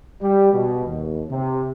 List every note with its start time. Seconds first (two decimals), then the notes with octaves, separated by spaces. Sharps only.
0.22 G3
0.53 B2
0.85 D#2
1.30 C3